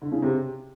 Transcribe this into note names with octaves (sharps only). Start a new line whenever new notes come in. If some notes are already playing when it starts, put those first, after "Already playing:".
D3
C#3
C3